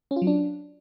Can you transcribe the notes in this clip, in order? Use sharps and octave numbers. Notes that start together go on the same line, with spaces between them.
C#4
F4
F#3
D4